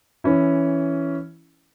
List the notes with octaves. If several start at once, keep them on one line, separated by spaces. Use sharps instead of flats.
E3 C#4 E4